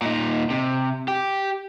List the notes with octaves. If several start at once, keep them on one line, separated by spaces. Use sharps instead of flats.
A#2 D#4
C3
G4